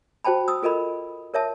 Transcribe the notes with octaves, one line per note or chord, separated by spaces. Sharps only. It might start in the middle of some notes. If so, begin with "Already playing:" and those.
F#4 C5 G5 A5 B5
D#6 E6
F4 A4 A#4 D#5 B5
A#4 C#5 E5 A5